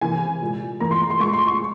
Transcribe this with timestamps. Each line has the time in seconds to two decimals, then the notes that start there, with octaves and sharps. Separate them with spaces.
0.01 C3 E3 A#3 G#5
0.41 A#2 G#3
0.80 E2 E3 A#3 A#5
0.91 C6
1.10 C6
1.20 A#2 G#3 C#6
1.33 C6
1.47 C#6